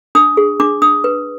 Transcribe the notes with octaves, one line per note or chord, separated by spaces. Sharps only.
D4 D#6
G#4
D4 D6
D4 D#6
B4